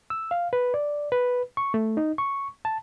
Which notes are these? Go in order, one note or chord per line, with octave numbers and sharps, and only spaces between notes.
E6
F5
B4
D5
B4
C#6
A3
D#4
C#6
A5